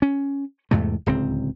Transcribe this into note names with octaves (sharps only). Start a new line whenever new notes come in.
C#4
E2 G#2 C3 A3
D1 C#2 C4